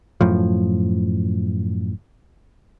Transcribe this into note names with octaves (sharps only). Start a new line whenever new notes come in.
F#2 A2 F3